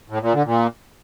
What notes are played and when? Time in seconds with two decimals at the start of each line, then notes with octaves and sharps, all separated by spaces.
0.10 A2
0.22 A#2
0.34 D3
0.45 A#2